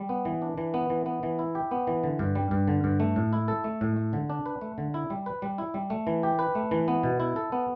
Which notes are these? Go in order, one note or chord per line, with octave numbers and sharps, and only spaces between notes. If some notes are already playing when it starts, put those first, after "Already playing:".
Already playing: G3
B3
E3
D4
E3
B3
E3
B3
E3
E4
G4
B3
E3
D3
G2
G3
G2
D3
G2
A3
A2
E4
A4
A3
A2
A3
D3
D4
B4
A3
D3
E4
G3
B4
G3
E4
G3
A3
E3
G4
B4
A3
E3
B3
B2
E4
A4
B3